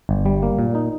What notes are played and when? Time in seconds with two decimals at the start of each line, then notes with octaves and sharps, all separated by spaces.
0.09 G1
0.25 G3
0.43 A#3
0.59 A#2
0.75 D#4